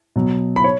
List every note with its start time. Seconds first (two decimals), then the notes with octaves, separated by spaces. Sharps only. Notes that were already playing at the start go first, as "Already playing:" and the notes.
0.16 B2 F#3
0.56 B5
0.64 C#5